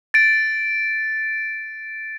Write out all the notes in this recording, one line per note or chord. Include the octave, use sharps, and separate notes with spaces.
A6 D7